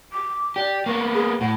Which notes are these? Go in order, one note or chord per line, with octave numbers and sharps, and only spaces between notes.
D6
G4 D5
A#3 B3 C#6
G#4
A2 F#5